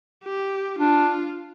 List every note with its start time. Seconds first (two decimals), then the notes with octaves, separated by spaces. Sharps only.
0.24 G4
0.79 D4 F4